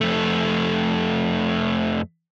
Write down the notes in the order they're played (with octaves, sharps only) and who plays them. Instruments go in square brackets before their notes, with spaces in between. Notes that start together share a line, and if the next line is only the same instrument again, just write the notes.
[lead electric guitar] F2 A3